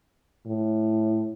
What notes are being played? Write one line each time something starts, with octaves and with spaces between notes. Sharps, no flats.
A2